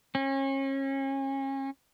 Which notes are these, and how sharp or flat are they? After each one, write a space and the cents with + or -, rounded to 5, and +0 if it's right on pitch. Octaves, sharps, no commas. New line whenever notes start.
C#4 -35